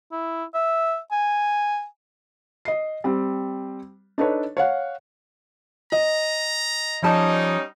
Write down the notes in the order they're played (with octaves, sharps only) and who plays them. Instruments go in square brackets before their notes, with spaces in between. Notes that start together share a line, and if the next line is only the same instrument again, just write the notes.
[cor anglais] E4
E5
G#5
[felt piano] D#5 C7
G3 C4
D4 D#4 A4 B4 C#5
C#5 F5 F#5
[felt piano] D#5 [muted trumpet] A#5
[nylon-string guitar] F3 A5 [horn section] G3 C#4 D#4